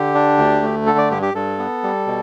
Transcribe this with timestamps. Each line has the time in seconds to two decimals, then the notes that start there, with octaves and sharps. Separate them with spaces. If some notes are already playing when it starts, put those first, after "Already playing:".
Already playing: D3 G4
0.14 D4
0.38 D2
0.62 A3
0.86 D3 A4
0.98 D5
1.10 G2 G4
1.22 G4
1.34 G2 A4
1.59 B3
1.83 G3
2.07 B2